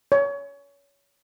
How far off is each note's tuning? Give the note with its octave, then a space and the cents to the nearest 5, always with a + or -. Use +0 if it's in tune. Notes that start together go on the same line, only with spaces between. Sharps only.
C#5 +25